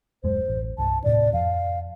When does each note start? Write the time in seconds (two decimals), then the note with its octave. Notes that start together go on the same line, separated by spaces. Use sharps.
0.24 D#1 F#2 G#3 C5
0.48 A1
0.78 C2 G2 A5
1.04 D#1 A2 C3 D5
1.33 F2 F5